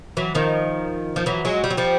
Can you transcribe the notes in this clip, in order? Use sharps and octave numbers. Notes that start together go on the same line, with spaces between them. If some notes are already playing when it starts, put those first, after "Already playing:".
E3 F#3
D#3 F3
F3
E3 F#3
F#3 G#3
G3
F#3
F3 G3